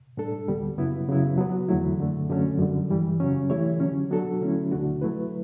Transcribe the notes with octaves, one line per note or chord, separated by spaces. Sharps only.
A2 G3 D4 A4
D2 D3 G3 B3
F#2 C#3 F#3 B3 E4
F#2 C#3 F#3 B3 E4
F#3 B3 F#4
E2 D3 F#3 A3 E4
F#2 D3 A3
F#2 D3 F#3 A3 C#4
F#2 D3 G3
G2 E3 G3
F#2 C#3 F#3 C#4
E3 A3 E4 G4 C#5
D3 F#3 C#4
F#3 B3 D4 F#4 A4
D3 F#3 A3 C#4 E4
D2 D3 A3 D4 F#4
F#3 A3 E4 B4